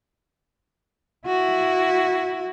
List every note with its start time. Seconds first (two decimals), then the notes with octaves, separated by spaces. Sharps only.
1.27 E4 F#4